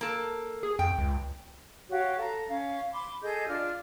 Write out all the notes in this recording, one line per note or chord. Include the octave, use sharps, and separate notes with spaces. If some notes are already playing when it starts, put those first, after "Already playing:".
A#3 A4
G#4
F2 G5
C#2
F#4 G4 C#5 F5
A4 A#5
C#4 F5
B5 C6 D6
G#4 A4 D#5 G6
D4 F4 F6